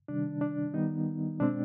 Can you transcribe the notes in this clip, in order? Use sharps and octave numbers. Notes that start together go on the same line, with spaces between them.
C3 D#3 G3 D4
D4
D#3 G3 B3 D#4
B2 G#3 C4 D4